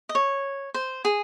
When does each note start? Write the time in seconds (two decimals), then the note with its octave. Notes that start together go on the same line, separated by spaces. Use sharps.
0.09 D#5
0.15 C#5
0.74 C5
1.05 G#4